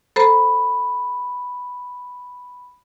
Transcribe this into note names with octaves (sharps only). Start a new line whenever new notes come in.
A4 C5 A#5 B5